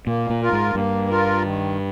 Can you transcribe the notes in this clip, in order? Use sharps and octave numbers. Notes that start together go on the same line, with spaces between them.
A#2 A#3
A#2
F4 A#4
G#2
G2 A#3
F4 A#4
D#3